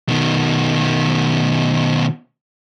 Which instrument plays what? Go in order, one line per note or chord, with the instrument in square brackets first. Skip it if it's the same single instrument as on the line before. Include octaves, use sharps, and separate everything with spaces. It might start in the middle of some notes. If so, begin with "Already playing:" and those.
[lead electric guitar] B2 D#3